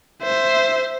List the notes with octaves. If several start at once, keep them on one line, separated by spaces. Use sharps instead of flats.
C5 E5